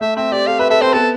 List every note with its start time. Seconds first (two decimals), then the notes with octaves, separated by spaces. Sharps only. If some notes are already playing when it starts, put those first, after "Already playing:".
0.01 A3 E5
0.16 C4 E5
0.32 G4 D5
0.47 A4 F5
0.59 B4 E5
0.70 A4 E5
0.82 C4 C5
0.93 B3 A4